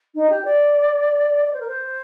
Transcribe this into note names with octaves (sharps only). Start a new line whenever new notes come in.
D#4
G4
D5
D5
C5
A#4
C5